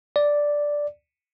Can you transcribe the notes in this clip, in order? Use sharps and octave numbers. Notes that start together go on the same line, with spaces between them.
D5